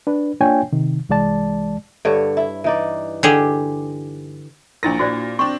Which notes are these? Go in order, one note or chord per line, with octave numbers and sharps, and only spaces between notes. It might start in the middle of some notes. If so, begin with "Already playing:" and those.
D4 B4
A#3 D4 F4 C#5 G5 G#5
C3 D#3
C2 E3 G#3 D5 A5
G2 D3 C#5
E4
E3 D#4 D5
D3 G4 G#4
A#1 D4 E4 A#4 A6 A#6
A#2 F#4 C5 D5
C4 D4 C#6